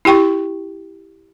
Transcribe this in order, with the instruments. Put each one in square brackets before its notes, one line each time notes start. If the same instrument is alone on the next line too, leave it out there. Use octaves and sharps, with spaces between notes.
[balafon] E4 G4 G5 C#6